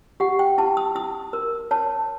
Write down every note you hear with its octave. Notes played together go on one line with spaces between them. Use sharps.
G4 F#5
G5
E4 A5
D#6
E4 D#6
A#4
C#5 A5